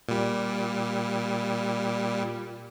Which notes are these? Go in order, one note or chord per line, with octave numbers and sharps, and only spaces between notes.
A#2 G3